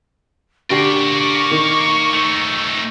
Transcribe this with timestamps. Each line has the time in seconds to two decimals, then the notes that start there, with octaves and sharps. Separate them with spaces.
0.70 D3 G4 A#4 D5 C#6 C7
1.51 D#3
2.14 A3 D#4